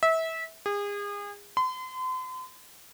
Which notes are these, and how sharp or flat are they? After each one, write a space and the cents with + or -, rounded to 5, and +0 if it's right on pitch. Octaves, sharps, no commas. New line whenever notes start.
E5 -25
G#4 -35
C6 -40